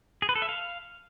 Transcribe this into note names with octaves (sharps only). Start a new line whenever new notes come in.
G#4
B4
A4
E5
F5